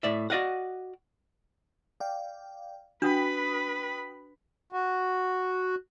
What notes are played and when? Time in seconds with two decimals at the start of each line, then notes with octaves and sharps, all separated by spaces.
0.03 A2 D5 E5
0.30 F#4 D5 D#5 F5 F#5
2.00 D5 F5 G5
3.02 D4 F#4 B4 G5 B5 D#6
4.73 F#4